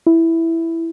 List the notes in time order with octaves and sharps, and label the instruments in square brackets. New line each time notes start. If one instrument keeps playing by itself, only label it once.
[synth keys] E4